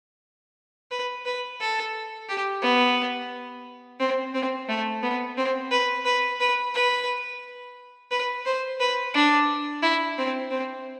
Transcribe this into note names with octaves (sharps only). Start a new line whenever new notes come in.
B4
B4
A4
G4
B3
C4
C4
A3
B3
C4
B4
B4
B4
B4
B4
C5
B4
D4
E4
C4
C4